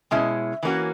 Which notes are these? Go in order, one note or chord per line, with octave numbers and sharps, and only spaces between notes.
B2 G#3 C#4 E4
E3 A#3 C#4 F#4